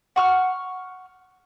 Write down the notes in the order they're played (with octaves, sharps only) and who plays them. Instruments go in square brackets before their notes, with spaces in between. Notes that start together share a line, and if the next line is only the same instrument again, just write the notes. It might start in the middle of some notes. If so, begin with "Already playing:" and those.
[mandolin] F#5 C#6 F6